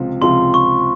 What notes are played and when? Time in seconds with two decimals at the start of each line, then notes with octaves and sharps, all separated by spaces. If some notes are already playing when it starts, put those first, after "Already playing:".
Already playing: C#2 C3 F3 C4 F4
0.21 C#2 C3 F3 C4 F4 C6
0.54 C#6